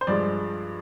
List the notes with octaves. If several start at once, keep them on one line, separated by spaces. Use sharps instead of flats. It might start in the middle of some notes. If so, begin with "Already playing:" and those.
C5
G2 F3 G#3 D5